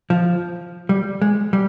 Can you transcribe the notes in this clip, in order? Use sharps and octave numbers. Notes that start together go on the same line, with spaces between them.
F3
G3
G#3
G3